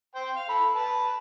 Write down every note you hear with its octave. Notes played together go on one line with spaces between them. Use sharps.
C5 G5
F5
A4 B5
B4 A5